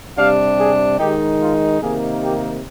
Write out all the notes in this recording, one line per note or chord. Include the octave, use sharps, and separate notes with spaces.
C3 G3 D4 F5
G#4
D#3 G#3 D#4 G4
F4
C3 D#3 A#3 D#4 G#4
G4